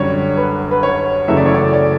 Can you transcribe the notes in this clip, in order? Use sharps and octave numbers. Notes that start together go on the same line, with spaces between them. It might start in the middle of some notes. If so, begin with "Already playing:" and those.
Already playing: F#2 D3 G3 C#5
B4
B4
C#5
F#2 C#3 E3 A3 E5
D5
C#5
D5
D5